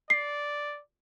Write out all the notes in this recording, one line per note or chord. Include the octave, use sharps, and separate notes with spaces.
D5 C7